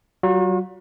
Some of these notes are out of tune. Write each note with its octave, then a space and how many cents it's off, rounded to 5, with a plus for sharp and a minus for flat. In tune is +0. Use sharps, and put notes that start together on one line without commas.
F#3 +35 F#4 -45